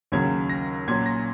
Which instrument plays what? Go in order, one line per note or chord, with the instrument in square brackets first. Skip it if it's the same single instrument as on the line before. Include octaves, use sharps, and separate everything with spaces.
[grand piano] D#2 C#3 F#3 C#4 G#6
A#6
A#2 F#3 C#4 G#6
A#6